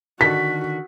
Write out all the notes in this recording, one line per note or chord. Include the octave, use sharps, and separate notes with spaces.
D3 D#3 F#4 A4 B6